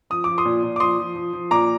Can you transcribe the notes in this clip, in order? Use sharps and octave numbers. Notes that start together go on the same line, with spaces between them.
F3 D#6
F3 D6
C6 D#6
A#2
A#2
D6
F3 C6 D#6
F3
F3
F3
A#2 A#5 D6